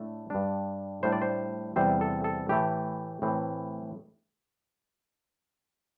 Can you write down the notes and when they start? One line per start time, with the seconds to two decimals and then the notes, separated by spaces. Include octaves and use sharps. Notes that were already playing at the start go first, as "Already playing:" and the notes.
Already playing: A2 A3 D4
0.30 G2 G3 D4
1.03 A2 G3 D4 C5
1.12 D5
1.22 C5
1.76 E2 C3 G3 C4 C5
2.01 A4
2.24 A4
2.49 A2 E3 A3 G4
3.22 A2 E3 C4